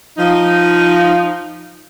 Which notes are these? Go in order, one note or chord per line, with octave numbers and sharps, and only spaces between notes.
F3 D#4